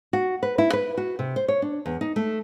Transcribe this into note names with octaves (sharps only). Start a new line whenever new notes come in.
F#4
B4
E4
B4
F#4
C3
C5
C#5
D4
E2
D#4
A3